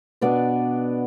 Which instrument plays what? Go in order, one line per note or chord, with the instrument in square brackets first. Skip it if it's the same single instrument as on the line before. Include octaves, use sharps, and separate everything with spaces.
[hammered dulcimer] B2 B3 D4 D5